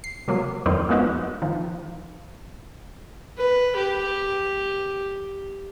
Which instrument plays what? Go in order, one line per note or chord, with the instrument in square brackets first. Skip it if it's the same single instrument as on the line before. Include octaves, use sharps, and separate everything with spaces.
[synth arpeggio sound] C7
C3 F#3 A#3
F2 D#3 E3 F#3 C4
F3 G#3 A#3 B3 D#4 F#4
D#3 F3
[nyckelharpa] B4
G4